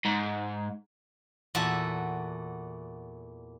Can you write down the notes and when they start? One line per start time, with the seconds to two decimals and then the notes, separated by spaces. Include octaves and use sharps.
0.05 G#2
1.55 E2 A#2 F#4 A4 E5